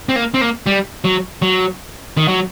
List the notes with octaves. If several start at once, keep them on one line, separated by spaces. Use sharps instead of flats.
C4
A#3
C4
A#3
G3
F#3
F#3
D#3
F#3